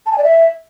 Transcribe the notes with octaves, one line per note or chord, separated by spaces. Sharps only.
A5
G#5
D5
E5